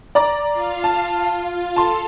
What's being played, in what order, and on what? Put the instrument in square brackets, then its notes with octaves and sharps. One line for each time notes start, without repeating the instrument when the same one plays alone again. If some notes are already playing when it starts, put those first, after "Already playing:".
[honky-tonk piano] D5 A#5 D6
[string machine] F4 F5
[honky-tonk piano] A5
[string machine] A4 [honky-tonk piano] A5 C6